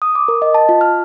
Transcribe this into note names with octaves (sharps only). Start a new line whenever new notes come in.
D#6
D6
A#4
D#5
A5
F4
F6